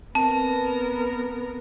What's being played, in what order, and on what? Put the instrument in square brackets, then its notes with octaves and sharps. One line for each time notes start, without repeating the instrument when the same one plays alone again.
[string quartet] B3 A#4 [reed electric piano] C4 [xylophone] A5